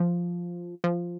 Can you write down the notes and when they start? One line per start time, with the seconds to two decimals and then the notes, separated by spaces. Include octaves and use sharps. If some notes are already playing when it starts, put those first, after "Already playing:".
Already playing: F3
0.84 F3